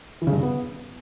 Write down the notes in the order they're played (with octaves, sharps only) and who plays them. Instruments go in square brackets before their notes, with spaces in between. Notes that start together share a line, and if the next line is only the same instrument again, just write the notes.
[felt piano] E3
C#3
G2
C#3
B3